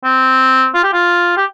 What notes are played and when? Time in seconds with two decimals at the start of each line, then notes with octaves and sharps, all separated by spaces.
0.04 C4
0.74 F4
0.84 G4
0.93 F4
1.37 G4